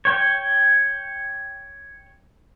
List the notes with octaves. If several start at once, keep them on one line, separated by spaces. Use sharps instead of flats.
C#5 G5